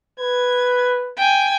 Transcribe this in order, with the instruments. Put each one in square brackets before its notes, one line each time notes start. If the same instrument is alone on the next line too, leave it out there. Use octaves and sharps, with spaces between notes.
[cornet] B4 [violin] G#6
[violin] G5 G#5